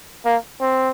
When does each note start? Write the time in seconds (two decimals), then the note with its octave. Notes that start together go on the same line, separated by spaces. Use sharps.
0.26 A#3
0.61 C4